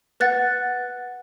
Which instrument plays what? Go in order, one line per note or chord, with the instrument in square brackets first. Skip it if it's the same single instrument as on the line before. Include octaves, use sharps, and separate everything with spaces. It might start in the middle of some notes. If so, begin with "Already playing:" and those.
[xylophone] B4 F#5 F#6 A6